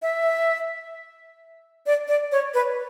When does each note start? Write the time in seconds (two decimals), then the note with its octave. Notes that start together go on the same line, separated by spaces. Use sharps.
0.02 E5
1.86 D5
2.08 D5
2.32 C#5
2.54 B4